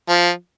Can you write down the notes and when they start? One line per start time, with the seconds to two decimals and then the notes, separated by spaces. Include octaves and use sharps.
0.09 F3